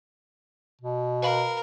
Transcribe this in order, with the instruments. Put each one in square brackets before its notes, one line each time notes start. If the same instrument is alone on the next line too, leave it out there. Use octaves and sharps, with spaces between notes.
[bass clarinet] B2
[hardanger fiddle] A#4 [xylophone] B4 F5 B5